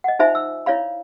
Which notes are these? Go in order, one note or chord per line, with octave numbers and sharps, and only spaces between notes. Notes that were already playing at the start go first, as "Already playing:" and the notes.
D#5 F#5
D#4 F4 C5 E5 G#5 B5
E6
E4 C#5 D5 F5 B5